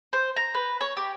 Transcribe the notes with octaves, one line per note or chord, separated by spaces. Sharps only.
C5
A#5
B4
C#5
G4